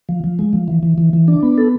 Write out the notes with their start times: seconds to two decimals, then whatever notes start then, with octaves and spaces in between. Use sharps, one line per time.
0.09 F3
0.24 F3
0.39 G#3
0.53 F3
0.68 E3
0.83 E3
0.98 E3
1.13 E3
1.28 D4
1.43 B3
1.58 A4